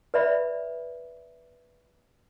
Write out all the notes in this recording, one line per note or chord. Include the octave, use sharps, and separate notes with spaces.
B4 D5 E5 B5